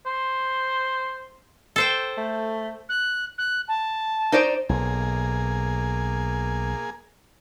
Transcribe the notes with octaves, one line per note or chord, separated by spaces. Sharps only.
C5
A4 C5 G5
A3
F#6
F#6
A5
D#4 C5 D5
B1 A#3 G#4